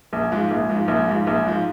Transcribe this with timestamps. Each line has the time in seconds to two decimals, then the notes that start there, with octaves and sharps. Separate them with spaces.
0.13 A#1
0.32 G#2 F3
0.51 A#1
0.69 G#2 F3
0.88 A#1
1.07 G#2 F3
1.27 A#1
1.45 G#2 F3